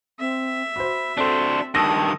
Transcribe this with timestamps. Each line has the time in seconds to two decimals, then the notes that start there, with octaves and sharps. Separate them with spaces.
0.19 C4 E5
0.76 F#4 C5 B5
1.18 C4 D4 F#4 A4 C5
1.75 G2 D#3 A5 D#6 E6 A#6